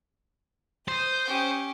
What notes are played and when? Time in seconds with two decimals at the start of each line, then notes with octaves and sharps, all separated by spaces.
0.88 C5 D#6 G6
1.25 C#4 G4